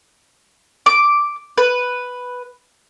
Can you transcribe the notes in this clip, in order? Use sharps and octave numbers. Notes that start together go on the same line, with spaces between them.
D6
B4